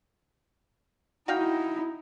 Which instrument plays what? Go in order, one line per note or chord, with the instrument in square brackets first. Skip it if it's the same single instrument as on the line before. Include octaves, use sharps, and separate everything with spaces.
[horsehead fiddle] D#4 E4 [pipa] F#4 F5 G5